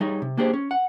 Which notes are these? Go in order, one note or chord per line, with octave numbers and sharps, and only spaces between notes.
G3 D#4 G#4 C#5
C3
A#3 D4 G4 G#4 A#4 C5
C#4
F#5